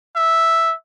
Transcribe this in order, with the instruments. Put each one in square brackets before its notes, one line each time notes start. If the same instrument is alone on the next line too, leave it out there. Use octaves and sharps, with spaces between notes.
[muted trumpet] E5